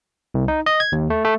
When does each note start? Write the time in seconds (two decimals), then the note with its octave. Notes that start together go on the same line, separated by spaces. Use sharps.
0.34 C2
0.48 D#4
0.66 D#5
0.80 G#6
0.92 D#2
1.10 A3
1.25 A3